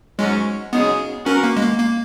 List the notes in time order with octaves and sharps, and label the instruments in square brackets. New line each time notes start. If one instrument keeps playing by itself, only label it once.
[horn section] G#2 F#3 C#4 [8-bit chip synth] G#3
[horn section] F#2 C#3 G#3 D#4 G#4 [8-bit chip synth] B3
[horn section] F#3 B3 F#4 A#4 [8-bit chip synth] C#4
[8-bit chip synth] A#3
G#3
A#3
A#3